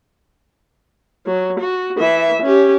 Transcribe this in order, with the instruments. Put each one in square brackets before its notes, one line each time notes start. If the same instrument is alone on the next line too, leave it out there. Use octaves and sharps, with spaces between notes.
[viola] F#3
F#4
E3 E5
C#4 G4